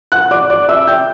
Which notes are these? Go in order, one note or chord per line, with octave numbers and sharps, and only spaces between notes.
F#5 F#6
D5 D6
D5 D6
E5 E6
G5 G6